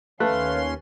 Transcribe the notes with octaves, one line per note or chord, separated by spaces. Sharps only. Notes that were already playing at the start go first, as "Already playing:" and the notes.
D#2 A3 C#4 B4 F5 A5 C6 F#6